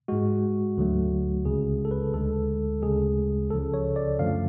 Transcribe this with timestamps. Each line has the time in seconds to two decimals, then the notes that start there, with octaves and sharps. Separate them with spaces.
0.08 G#2 G#3 F#4
0.77 D2 D3 F#3 A3
1.45 C#2 C#3 G#3 G#4
1.85 A4
1.91 B4
2.14 D2 D3 G#3 A4
2.82 D2 C#3 G#3 G#4
3.50 C#2 C#3 F3 A4
3.74 C#5
3.96 D5
4.19 F#2 D3 F3 A3 F5